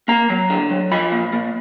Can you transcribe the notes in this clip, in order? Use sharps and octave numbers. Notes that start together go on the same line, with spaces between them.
A#3 A#5
F#3
D3
F#3
F3 B5
A#2
A#2